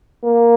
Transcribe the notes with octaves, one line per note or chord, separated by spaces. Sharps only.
A#3